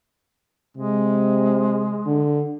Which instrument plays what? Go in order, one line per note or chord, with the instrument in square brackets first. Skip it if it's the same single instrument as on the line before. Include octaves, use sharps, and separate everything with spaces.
[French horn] C3 [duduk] G#3
[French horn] D3